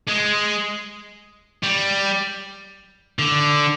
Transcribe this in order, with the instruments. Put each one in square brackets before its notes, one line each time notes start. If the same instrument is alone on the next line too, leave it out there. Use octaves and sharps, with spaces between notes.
[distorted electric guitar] G#3
G3
D3